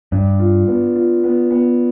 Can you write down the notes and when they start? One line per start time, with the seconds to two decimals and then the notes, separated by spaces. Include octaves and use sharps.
0.12 G2 D4
0.39 F4
0.67 B3
0.95 F4
1.24 B3
1.51 B3